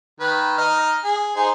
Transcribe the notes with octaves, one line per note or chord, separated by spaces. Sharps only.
D#3 B4
D#4 D#5 F6
G#4
D#4 G#4 C5